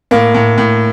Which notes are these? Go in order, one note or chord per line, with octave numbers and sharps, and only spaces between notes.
A2 A#3
A2
A2